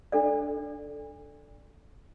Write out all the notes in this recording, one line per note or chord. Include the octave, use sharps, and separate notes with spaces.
D4 A4 D5